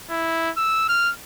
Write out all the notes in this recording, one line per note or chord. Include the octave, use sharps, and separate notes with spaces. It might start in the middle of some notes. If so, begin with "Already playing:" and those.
E4
E6
F6